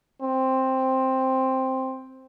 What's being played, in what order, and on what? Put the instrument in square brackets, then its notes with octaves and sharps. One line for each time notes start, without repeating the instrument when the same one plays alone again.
[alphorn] C4